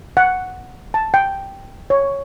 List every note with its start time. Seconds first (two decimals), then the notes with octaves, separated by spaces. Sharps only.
0.17 F#5
0.94 A5
1.14 G5
1.90 C#5